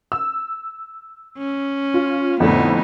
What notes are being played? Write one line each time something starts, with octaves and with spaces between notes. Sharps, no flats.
E6
C#4
F4
F2 A2 D3 B3 D#4